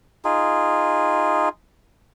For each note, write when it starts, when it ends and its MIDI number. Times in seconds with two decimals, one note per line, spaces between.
0.25 1.49 63
0.25 1.49 65
0.25 1.49 68